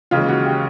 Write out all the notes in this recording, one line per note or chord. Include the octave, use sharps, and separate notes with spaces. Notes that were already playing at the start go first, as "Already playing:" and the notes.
D#2 C#3 E3 G#3 F4
F#4
G4